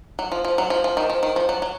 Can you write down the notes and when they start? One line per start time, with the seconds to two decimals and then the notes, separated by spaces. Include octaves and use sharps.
0.19 F#3
0.32 F3
0.45 F3
0.58 F#3
0.70 F3
0.84 F3
0.97 D#3
1.10 F3
1.23 D#3
1.36 F3
1.49 F#3
1.62 F#3